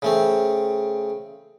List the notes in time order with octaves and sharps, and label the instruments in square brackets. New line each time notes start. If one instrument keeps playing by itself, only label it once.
[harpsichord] C#3 A3 C4